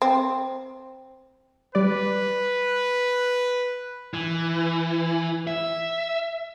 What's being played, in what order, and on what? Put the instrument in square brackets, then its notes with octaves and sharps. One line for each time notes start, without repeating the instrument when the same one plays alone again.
[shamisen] C4
[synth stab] G3 D5 [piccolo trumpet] B4
[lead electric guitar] E3
E5